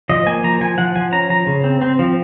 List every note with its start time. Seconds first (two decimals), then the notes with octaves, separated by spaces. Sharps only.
0.09 F3 D#5
0.27 A#3 G#5
0.44 F3 A#5
0.61 F3 G#5
0.78 F3 F#5
0.95 F3 G#5
1.12 C#4 A#5
1.30 F3 A#5
1.47 C#3
1.64 C4
1.82 C4
1.99 F3